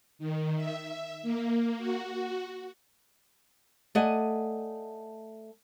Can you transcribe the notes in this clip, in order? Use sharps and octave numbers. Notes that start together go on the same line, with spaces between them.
D#3
E5
A#3
F#4
A3 D5 D#5 F#5 G#5